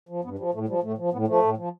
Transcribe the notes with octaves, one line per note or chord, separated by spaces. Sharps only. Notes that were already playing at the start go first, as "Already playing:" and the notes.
F3
G2 B3
F3 G3
A2 A3
F3 G3
A2 A3
F3
A2 B3
F3 A3
A2
F3